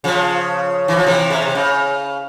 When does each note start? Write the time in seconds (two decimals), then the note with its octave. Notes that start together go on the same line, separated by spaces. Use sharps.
0.04 C#3 F3
0.88 E3
0.97 F3
1.07 C3 E3
1.30 C#3
1.42 C3
1.55 C#3